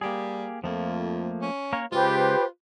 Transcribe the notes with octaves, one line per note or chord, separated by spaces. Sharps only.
G3 A#3 G4 G#4
F2 F3 A3 A#3
C#4
A#3 A#4 C#5
C#3 G#3 F4 G4 B4 C5